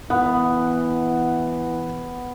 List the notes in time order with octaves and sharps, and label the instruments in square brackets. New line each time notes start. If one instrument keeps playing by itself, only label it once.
[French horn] E3 [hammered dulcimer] B3 [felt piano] F#5